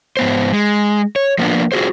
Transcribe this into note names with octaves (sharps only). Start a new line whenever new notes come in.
G#2 B3 C5
G#3
C#5
F3 A#3 B3 D4
F4 F#4 G#4 C5